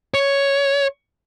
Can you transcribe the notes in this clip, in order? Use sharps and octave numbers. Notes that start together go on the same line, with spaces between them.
C#5